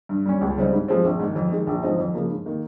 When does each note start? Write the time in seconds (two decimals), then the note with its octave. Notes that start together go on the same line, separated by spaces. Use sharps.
0.09 G2
0.26 G3 C#4
0.41 C#2
0.57 C#3 G3 C4 D#4
0.73 G#2
0.88 F3 G#3 C4
1.04 A#1
1.20 G#2 D#3
1.36 F2
1.50 D#3 G#3
1.67 A#1
1.83 G#2 F3 C4 D#4
1.98 F2
2.14 C#3 F3 A#3
2.30 G#2
2.46 D#3 A#3